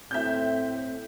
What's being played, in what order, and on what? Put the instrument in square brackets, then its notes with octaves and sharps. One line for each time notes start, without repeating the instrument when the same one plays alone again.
[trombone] A2 [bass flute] C4 [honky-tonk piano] E5 G6